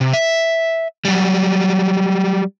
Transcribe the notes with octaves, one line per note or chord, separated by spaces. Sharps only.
C3
E5
F#3 G3